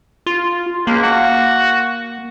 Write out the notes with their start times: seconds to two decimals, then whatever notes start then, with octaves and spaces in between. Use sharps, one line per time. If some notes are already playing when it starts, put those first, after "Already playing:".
0.26 F4
0.87 C#2 A#3
1.03 F#4